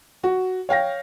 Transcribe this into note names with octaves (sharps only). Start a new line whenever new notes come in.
F#4
C#5 F5 G5 A#6